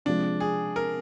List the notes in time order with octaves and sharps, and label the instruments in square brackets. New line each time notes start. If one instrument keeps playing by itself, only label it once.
[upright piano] C3 F3 G#3 [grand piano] D4
[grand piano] G#4
A#4